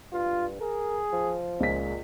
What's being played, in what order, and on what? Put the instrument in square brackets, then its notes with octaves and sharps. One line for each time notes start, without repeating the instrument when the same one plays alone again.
[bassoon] G2 [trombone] F4
[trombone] G#4 [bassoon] A#4
[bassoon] F3
[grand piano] C#2 G#4 B6 [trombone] A#2